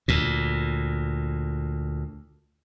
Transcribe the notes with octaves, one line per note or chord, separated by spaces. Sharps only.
D2 A#2